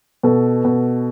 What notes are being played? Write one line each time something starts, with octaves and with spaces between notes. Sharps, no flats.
B2 A4
B2